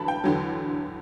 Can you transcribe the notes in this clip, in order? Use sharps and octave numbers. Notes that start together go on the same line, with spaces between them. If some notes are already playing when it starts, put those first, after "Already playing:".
Already playing: E2 D3 F#3 A5 B5
G5
E2 D3 F#3